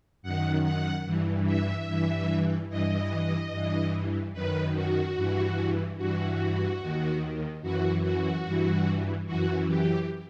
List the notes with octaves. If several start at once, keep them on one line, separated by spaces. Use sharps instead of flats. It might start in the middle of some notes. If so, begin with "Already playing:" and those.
F#2 D#3 F#5
F#5
G2 E3
E5
G2 E3
G2 E3 D#5
G2 E3
F#2 D#3 B4
F#4
G2 E3
G2 E3 F#4
D#2 D#3
F#2 E3 F#4
F#4
G2 E3
F#2 E3 F#4
G4